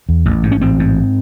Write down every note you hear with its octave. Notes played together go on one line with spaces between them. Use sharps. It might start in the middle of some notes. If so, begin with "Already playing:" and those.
E2
A1
G#2
C#4
A1 C4
G#2